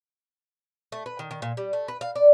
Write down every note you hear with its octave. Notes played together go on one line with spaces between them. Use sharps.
A3
B4
D#3
D#3
A#2
G3
A3
B4
F5
D5